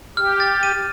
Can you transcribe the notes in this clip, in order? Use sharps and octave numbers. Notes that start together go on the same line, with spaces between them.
G4 F6
A6
D#7